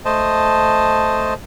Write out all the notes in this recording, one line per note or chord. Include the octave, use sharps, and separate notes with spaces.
A3 C5 D#5 A5